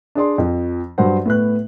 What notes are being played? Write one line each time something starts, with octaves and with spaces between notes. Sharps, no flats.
D4 G#4 D5 C6
F2 F3
G2 F#3 C5 F#5
A2 B3 F#6